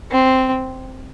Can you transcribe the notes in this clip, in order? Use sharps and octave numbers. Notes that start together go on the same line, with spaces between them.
C4